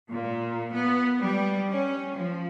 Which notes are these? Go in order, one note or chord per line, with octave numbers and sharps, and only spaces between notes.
A#2
B3
G3
C#4
F3